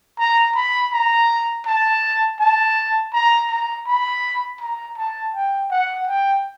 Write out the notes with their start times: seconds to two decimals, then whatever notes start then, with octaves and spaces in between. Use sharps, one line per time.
0.19 A#5
0.55 B5
0.92 A#5
1.66 A5
2.40 A5
3.13 A#5
3.49 A#5
3.86 B5
4.61 A#5
4.97 A5
5.34 G5
5.71 F#5
6.07 G5